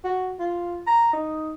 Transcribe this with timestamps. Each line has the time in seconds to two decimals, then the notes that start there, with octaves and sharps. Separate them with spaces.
0.04 F#4
0.40 F4
0.87 A#5
1.13 D#4